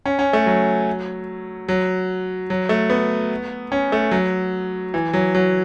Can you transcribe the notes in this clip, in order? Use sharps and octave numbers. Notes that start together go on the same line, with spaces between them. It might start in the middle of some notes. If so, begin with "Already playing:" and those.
C#4
C#4
A3
F#3
F#3
F#3
A3
B3
C#4
A3
F#3
E3
F#3
F#3